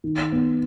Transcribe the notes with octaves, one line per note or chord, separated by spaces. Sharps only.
D#3
B3